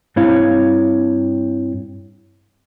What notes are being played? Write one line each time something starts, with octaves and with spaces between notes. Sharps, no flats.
G2 C4 E4 C#5 F5